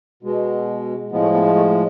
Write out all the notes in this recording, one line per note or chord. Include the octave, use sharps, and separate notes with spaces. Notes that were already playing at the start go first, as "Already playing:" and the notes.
B2 G#3
A2 F3 G#3 B3
A3
B3
A3
A3